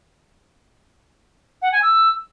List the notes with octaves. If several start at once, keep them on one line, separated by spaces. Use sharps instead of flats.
F#5
G#5
E6